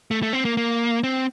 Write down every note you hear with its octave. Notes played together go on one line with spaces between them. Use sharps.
A3
A3
C4
A#3
A#3
C4